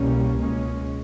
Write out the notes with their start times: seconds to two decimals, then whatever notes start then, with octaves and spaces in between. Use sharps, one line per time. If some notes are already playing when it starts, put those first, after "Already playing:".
Already playing: C2 B2 G3 A#3 C#4
0.36 C#2 B2 G#3 C#4